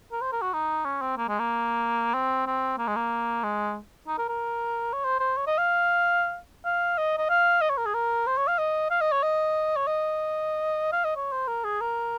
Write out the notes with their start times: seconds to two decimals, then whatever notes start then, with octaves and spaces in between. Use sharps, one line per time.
0.12 A#4
0.21 C5
0.32 A#4
0.42 F#4
0.53 D#4
0.85 C#4
1.01 C4
1.17 A#3
1.28 G#3
1.39 A#3
2.14 C4
2.47 C4
2.78 A#3
2.87 G#3
2.96 A#3
3.43 G#3
4.07 D#4
4.18 A#4
4.29 A#4
4.93 C#5
5.04 C5
5.20 C5
5.37 C#5
5.47 D#5
5.58 F5
6.65 F5
6.98 D#5
7.18 D#5
7.29 F5
7.61 D#5
7.70 C#5
7.77 A#4
7.86 G#4
7.94 A#4
8.27 C5
8.37 C#5
8.48 F5
8.58 D#5
8.91 F5
9.01 D#5
9.12 C#5
9.23 D#5
9.76 C#5
9.87 D#5
10.92 F5
11.04 D#5
11.16 C#5
11.32 C5
11.48 A#4
11.64 G#4
11.81 A#4